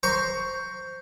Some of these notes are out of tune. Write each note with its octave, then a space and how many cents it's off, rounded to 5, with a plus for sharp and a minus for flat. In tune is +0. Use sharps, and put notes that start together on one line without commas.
C5 +0 A#5 +0 C#6 +10